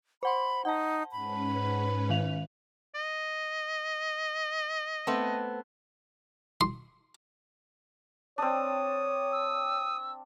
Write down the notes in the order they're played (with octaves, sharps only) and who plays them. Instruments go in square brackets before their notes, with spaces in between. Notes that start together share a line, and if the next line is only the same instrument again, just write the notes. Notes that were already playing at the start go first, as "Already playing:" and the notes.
[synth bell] C5 F#5 C6 [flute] B5
[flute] D#4 [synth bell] F#5 A5
[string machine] G#2 C#4 B4 [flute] B5
[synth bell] D#3 F5 F7
[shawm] D#5
[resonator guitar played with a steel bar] A3 B3 C4
[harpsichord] C6
[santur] C4 D4 [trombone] C#5 [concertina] D#6
[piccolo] E6